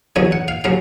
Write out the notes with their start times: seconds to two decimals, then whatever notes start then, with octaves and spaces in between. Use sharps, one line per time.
0.16 E2 C#3 F#3 G#5
0.32 F#5
0.48 F5
0.64 C#3 F#3 F5